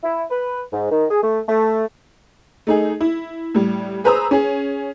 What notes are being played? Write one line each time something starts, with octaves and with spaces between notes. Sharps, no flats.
E4
B4
G#2
D#3
G#4
A3
A3
A3 D#4 G#4
E4
A2 G3
G#4 B4 C5 A#5 D#6 E6
C#4 G#4